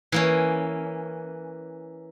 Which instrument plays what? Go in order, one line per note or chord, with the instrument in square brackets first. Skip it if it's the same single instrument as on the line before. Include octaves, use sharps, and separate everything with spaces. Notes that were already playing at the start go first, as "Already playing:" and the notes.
[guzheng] E3 A#3 C#4